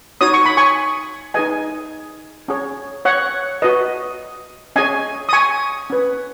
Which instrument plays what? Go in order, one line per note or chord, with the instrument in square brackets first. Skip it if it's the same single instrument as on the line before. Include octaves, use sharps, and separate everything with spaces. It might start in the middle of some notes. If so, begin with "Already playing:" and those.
[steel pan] D#4 F#4 C#5 D#6
C#6
B5
G#5 C#6
D#4 G#4 B4 D#5 G#5
C#4 G#4 C#5
C#5 F#5
F#4 B4 D#5
C#4 G#4 C#5 D#5 G#5
D#6
G#5 C#6
C#4 B4